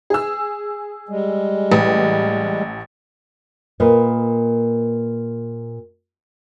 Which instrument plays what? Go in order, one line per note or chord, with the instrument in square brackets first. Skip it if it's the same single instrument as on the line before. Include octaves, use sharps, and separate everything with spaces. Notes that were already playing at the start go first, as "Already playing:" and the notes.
[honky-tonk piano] G#4 E6
[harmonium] G3 G#3
[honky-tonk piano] A1
[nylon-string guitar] A#2 A#4 B4 D#5